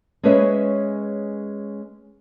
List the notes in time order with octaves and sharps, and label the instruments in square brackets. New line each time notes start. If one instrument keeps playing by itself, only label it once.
[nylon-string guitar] G#3 C#4 G#4 B4 C#5 E5